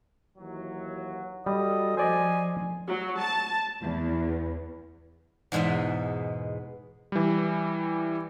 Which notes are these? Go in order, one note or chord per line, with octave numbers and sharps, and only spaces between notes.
D#2 E3 F#3
G3 F#4 A4 D#5
F3 C5 D5 D#5 G#5
F#3
A5
E2
E2 G#2 B2 G#3 E5
E3 G3